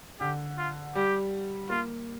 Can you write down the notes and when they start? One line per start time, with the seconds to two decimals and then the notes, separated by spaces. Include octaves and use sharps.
0.20 D3 G4
0.58 F4
0.95 G3 G4
1.70 A#3 F4